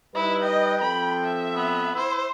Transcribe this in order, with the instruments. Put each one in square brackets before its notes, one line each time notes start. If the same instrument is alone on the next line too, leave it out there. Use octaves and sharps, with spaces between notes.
[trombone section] G3 D#4 B4 [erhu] E4
[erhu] D#5 [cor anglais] G5
[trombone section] F3 C4 A4 [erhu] B5
[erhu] E5
[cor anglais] B3
[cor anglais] E4 [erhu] C5